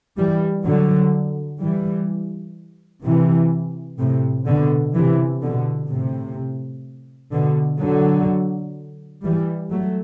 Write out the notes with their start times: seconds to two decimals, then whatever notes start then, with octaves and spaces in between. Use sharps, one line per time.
0.18 E3 G3
0.66 D3 F#3
1.61 E3 G3
3.03 C3 E3
3.98 A2 C3
4.46 B2 D3
4.95 C3 E3
5.42 B2 D3
5.89 A2 C3
7.32 B2 D3
7.80 D3 F#3
9.23 E3 G3
9.71 F#3 A3